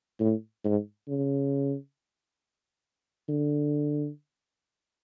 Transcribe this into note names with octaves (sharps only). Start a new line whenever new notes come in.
A2
G#2
C#3
D3